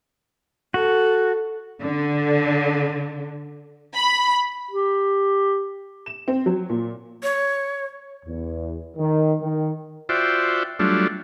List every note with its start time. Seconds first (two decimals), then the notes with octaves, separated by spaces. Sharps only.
0.74 F#4 A4
1.81 D3
3.96 B5
4.71 G4
6.06 E7
6.28 C4
6.46 F#3
6.69 A#2
7.23 C#5
8.25 E2
8.97 D#3
9.41 D#3
10.09 F4 F#4 C5 D5 E5 G5
10.79 F#3 G3 A3 D4 F4